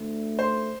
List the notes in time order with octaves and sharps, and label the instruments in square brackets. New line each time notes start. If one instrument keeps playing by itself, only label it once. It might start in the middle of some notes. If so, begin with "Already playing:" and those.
Already playing: [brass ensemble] D2 D3 A3
[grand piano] C5